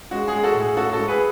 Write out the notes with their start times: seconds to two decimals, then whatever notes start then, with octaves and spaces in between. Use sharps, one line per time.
0.11 G#3 F#4
0.28 G#4
0.33 G#3
0.43 F#4 A4
0.54 A2
0.61 G#4
0.76 A2 F#4 A4
0.92 F#4 A4
0.98 G#3
1.08 G#4 B4